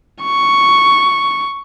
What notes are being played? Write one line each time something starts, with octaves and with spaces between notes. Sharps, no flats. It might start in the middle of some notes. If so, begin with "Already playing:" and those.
C#6